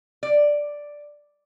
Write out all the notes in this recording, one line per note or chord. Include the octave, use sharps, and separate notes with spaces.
D5